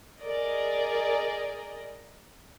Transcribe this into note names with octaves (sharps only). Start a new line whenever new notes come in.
G#4 A#4 D5 D#5